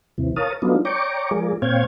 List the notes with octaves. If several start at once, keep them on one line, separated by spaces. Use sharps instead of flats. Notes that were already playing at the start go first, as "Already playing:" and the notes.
D#2 C3 E3
A#4 C#5 F5 A5 D#6
F#3 A3 B3 D4 D#4 F4
C#5 D5 G5 A#5 C#6 D6
F3 G#3 G#4 A#4 D5
A#2 C4 C#5 F5 G5 G#6